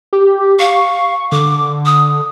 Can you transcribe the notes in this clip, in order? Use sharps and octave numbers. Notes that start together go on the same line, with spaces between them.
G4
F5 C#6
D3 D6
D#6